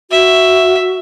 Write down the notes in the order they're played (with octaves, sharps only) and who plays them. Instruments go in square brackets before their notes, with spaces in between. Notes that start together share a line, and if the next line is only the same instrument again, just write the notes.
[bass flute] F#4 [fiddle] E5